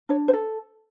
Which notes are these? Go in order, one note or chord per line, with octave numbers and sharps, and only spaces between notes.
D4 C#5
C5
A4